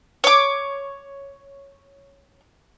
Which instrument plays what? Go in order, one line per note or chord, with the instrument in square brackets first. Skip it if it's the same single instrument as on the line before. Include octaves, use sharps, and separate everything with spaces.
[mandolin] C#5 D6